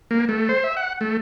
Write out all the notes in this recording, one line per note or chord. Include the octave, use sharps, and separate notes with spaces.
A#3
A3
C5
E5
F#5
A3